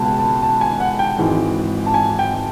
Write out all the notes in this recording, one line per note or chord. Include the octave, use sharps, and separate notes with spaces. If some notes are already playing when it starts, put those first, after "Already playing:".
Already playing: C#2 B2 G#3 A5
A5
A5
G#5
F#5
G5
G#1 G#2 E3 G#3
A5
G#5
G5